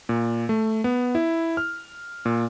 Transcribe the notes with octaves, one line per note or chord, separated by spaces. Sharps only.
A#2
A3
B3
E4
F6
A#2